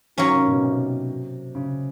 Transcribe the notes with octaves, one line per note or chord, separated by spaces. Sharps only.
D#3 F#3 A#3 C#4
C3
B2
C3
C#3